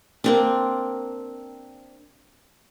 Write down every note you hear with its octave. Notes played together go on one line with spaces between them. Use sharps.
A#3 C4 D4